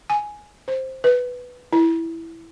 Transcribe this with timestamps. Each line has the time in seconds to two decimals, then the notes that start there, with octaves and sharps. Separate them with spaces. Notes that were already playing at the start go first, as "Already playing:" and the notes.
0.10 G#5
0.68 C5
1.04 B4
1.73 E4